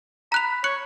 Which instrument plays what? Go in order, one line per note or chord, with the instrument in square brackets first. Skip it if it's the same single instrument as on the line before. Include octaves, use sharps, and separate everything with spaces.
[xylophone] A#5 F#6 F7 [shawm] B5
[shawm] C#5 [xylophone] F#6 C#7 F#7